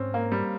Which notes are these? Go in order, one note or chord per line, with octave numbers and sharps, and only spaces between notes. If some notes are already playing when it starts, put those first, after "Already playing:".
Already playing: G#2 C4 C#4
A#3
G3